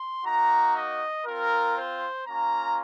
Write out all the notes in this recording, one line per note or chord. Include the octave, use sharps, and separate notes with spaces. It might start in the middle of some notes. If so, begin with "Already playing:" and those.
Already playing: C6
A#3 D#4 F#4 A#5
D#5
C4 F4 A#4
C5
A#3 C#4 F4 A#5